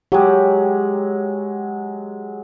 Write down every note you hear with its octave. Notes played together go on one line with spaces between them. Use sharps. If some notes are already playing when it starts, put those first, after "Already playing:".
F#3 G#3 G4